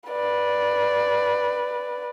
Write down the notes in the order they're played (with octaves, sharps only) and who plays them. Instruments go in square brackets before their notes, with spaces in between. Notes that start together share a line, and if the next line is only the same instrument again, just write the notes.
[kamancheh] B4 D5